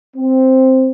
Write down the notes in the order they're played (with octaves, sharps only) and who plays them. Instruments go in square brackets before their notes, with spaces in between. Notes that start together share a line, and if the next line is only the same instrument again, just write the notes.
[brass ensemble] C4